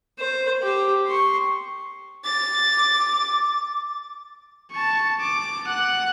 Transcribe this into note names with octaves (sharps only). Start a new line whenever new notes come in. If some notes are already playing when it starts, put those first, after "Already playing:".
C5
G4
C6 C#6
D6 A6
A5 C#6
D6
F#5 F#6